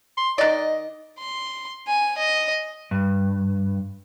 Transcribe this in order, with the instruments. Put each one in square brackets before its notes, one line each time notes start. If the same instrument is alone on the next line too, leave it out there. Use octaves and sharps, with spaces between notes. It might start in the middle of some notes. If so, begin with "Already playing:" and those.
[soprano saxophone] C6
[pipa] D#3 D5 [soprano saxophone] D#5
[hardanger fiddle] C6
G#5
D#5
[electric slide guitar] G2